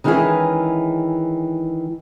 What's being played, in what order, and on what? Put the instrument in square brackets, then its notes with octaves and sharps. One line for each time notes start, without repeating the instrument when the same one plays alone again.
[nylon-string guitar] D#3 E3 G#3 C#4 E4 G#4